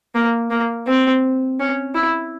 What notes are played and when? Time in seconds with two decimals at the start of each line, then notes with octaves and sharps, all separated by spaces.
0.15 A#3
0.51 A#3
0.87 C4
1.60 C#4
1.95 E4